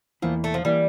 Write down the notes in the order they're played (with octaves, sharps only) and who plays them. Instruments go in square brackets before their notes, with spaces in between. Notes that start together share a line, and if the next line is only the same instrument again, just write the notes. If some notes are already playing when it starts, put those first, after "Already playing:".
[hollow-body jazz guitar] E2 E3 A#3 E4 [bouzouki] F3
[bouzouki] A3
F3
[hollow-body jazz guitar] E3 A#3 E4 [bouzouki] G3